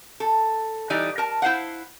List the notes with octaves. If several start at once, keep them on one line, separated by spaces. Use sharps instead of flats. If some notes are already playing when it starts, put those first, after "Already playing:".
A4
E3 G3 D#4 D5
A#4 A5
E4 C5 F5 F#5